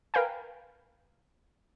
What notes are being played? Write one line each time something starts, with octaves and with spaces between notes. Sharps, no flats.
A#4 B4 F5 G5 G#5